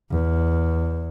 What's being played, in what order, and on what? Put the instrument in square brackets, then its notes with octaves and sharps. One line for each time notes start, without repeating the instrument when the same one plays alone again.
[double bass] E2